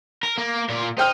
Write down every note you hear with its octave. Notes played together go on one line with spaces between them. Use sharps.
A#4
A#3
A#2 A#4
D#4 C5 G5 F6